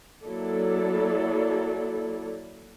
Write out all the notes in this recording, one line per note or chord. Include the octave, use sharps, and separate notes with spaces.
F#3 A#3 E4 A4 D5